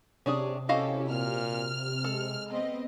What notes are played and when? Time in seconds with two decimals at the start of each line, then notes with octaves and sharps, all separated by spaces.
0.26 C3 C#4 D4 G#4
0.69 C#4 E4 F#4 G4 A4 D#5 F5
1.09 A#2 F6
2.04 G#3 A4
2.52 B3 C4 D#5